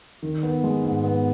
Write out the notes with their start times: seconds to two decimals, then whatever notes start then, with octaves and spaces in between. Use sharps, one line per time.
0.22 D#3
0.43 B3
0.64 G#3
0.84 G#2
1.04 B3